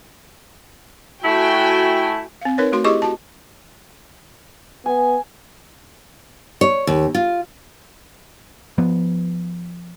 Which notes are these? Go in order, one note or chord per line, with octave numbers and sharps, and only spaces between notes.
A3 E4 F#4 G5 G#5
C4 F5
D#4 A#4 B4 C#5
A3 F#4 C6
E4 G4 G#4 D#5 C#6 D6
F#4 A5
B3 G#5
C#5
D#2
F4
F3 B3